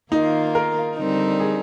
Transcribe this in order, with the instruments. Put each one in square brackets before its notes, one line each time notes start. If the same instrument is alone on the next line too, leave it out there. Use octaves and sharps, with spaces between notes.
[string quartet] D#3 A#3 F4 [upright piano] D#4
[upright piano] A#4
[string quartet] D3 G3 C4 D#4 A#4
[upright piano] G#4